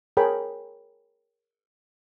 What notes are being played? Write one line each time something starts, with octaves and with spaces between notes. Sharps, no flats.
G#4 A#4 C#5 G5 B5